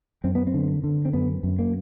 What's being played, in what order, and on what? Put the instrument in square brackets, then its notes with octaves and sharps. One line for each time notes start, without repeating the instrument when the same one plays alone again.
[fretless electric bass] F#2 C4
B3
C4
D3
D3
C4
F#2 B3
F#2
A#3